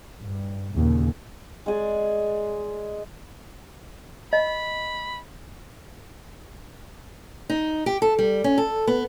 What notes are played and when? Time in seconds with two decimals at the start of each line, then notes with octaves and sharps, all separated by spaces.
0.23 G2
0.74 D#2 A#2 C#3
1.66 G#3 G#4 D5
4.33 D#5 B5
7.49 D#4
7.86 G4
8.02 A4
8.19 G3
8.44 C#4
8.58 A4
8.87 B3